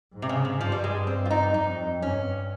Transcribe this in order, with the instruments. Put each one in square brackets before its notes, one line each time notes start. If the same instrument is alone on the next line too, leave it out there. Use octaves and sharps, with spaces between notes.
[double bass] G#2
[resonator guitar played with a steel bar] C3
C#3
C#3
[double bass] G2 [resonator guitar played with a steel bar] F3
[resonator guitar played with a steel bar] G3
G#3
C4
F4
D#4
[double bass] F2 [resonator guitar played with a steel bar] D#4
[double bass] G2 [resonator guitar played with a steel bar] C#4